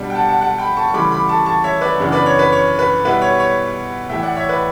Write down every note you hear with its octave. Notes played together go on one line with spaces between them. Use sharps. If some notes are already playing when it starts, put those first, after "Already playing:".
Already playing: B2 G3 D4
G5
F#5 A5
F#5 A5
F#5 A5
G5 B5
A5 C#6
C#6
D2 C#3 E3 G3 B5 D6
B5 D6
A5 C#6
A5 C#6
C#5 E5
B4 D5
F#2 C#3 E3 B3 D4
B4 D5
C#5
B4
C#5
B4
B2 G3 B3 E4 B4
C#5
C#5
A2 E3 B3 E5 G5
D5 F#5
C#5 E5
B4 D5